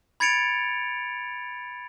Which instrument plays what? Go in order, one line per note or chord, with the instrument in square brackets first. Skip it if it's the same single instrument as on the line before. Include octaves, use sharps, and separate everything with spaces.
[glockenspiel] B5 G#6 A6 C#7 D7 F7